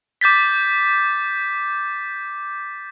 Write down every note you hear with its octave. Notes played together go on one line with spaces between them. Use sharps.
D6 G6 A6 B6